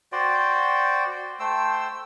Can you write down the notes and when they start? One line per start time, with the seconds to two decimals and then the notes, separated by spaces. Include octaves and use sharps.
0.12 F#4 C5 D5 G5
1.40 A3 C5 G5 E6